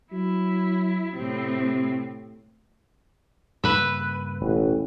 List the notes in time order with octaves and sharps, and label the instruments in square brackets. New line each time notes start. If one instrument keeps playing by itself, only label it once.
[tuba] F#3 [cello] E4
[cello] A2 C4 [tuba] C3
[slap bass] G2 C#3 A#3 [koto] B4 E5
[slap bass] E1 [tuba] A1